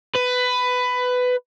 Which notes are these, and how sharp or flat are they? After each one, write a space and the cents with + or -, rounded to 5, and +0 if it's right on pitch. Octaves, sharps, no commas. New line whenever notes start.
B4 +15